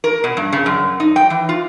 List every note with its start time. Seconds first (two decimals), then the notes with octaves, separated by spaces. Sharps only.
0.04 A#4
0.24 B2
0.37 G2
0.53 C#3
0.66 F#2
1.00 D#4
1.16 G5
1.30 E3
1.49 F4